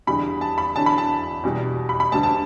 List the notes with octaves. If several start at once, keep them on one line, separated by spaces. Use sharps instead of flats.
E2 D3 G3 B5
A5
B5
E2 D3 F#3 A5
B5
A5
E2 B2 G3
B5
B5
D2 D3 G3 A5
A5